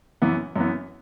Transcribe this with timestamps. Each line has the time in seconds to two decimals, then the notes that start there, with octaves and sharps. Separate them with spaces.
0.22 F#2 E3 B3
0.56 F#2 E3 B3